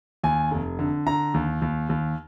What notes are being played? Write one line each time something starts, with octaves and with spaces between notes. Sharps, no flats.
D#2 G#5
F1
D3
D3 A#5
D#2
D#2
D#2